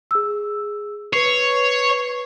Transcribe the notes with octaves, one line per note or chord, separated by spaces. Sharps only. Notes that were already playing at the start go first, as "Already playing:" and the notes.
G#4 E6
B4 C#5 C7